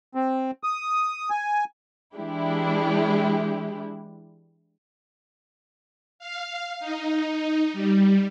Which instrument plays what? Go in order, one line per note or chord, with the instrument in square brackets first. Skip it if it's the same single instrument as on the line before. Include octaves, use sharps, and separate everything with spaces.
[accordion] C4
D#6
G#5
[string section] E3 G#3 D4 E4 G4
[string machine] F5
D#4
G3